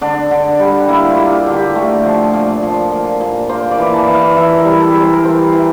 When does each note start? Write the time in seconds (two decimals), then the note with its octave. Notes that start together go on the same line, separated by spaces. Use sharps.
0.01 D3 D4
0.31 D3
0.59 G3
0.89 A#3 E4
1.10 F4
1.18 A#3
1.32 G4
1.46 D3
1.54 G4
1.75 A3
2.05 F3
2.34 A#2
2.62 F3
2.91 A#2
3.21 A#2
3.49 A#3 C5
3.71 D5
3.78 E3
3.93 A5
4.07 E3
4.14 F5
4.36 E3 E5
4.58 A#4
4.65 G3
4.80 A4
4.94 G3
5.02 C5
5.13 A#4
5.23 E3 C5
5.52 E3